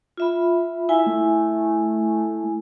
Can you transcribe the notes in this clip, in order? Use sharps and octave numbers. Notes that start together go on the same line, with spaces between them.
F4 E5 B5
E4 E5 G#5
A3